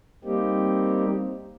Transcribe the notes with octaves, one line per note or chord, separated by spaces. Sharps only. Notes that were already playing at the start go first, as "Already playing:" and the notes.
G3 A#3 C4 D#4 G4